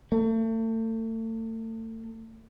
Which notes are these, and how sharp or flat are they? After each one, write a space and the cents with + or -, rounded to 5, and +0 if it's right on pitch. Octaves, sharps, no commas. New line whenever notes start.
A3 +35